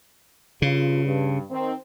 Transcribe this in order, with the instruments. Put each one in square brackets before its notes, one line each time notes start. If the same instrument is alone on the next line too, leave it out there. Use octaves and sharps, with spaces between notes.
[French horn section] G2 F4 [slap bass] C#3
[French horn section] G2
D#3 C4